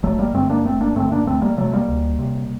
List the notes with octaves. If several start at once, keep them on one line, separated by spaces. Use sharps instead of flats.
G1 F#3 A3
G3 A#3
G2 D3 A3 C4
A#3 D4
G1 A3 C4
A#3 D4
G2 D3 A3 C4
A#3 D4
D2 A3 C4
G3 A#3
C3 F#3 A3
G3 A#3
D2
C3